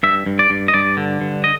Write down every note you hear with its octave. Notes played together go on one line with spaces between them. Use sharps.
G2 E5
G2
D5
G2
D#5
G2 D5
D3
G2
D#5